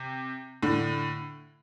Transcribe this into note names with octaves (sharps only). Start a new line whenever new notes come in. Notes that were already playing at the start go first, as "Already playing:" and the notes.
Already playing: C3
A2 D3